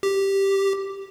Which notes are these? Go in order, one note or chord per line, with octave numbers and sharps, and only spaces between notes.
G4